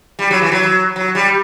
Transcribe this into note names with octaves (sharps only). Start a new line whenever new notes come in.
G3
F#3
E3
F#3
F#3
G3